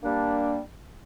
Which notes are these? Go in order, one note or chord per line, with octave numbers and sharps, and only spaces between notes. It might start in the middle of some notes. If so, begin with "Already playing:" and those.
G3 A#3 D4